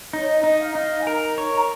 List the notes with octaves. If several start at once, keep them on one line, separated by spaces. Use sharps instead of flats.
D#4 C#5
D#5
D#4 D#5
F5
D#4 F5
G#5
A#4 A#5
C#5